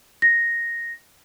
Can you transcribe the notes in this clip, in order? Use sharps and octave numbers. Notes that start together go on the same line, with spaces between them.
A#6